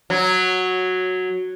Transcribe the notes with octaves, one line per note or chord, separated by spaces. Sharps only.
F#3